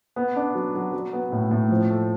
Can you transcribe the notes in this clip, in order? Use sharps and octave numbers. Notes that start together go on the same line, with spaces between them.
B3
D4
F#3
F#3
F#3
B3
A2
A2
F3
A3